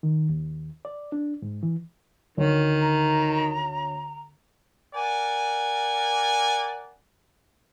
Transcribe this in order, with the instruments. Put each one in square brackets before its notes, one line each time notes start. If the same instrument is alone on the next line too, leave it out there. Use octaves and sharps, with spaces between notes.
[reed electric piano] D#3
D#2
D5
D4
G#2
E3
[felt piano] D2 C#5 [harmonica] D#3
[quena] A#5
[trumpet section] A#4 D5 F#5 G#5